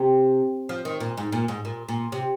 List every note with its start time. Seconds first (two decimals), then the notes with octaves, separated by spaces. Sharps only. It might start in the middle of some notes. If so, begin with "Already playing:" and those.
Already playing: C3
0.69 F3
0.85 D#3
1.00 A#2
1.17 G#2
1.32 A#2
1.48 G#2
1.65 A#2
1.89 A#2
2.12 C3